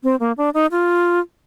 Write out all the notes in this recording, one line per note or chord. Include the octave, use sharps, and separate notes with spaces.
C4
A#3
D4
D#4
F4